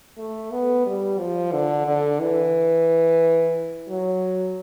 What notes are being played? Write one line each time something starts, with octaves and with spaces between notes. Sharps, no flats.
A3
B3
G3
F3
D3
D3
E3
F#3